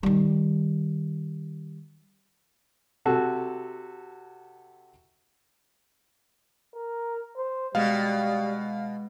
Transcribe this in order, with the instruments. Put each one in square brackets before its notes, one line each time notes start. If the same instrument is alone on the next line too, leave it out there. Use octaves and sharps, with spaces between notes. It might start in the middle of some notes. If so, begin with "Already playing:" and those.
[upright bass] D#3 G3
[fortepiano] C3 F#4 A4
[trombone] A#4
C5
[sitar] B2 [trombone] G3 [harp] G#3 [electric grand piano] F5